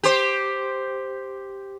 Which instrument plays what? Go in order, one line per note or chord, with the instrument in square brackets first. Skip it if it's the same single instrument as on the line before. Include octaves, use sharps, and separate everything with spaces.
[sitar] G4 C5